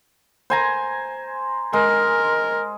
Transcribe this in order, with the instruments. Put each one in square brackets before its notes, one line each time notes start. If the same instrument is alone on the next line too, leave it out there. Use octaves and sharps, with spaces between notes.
[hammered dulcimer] C5 G#5 A#5
[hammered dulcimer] G#3 [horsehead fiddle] A#4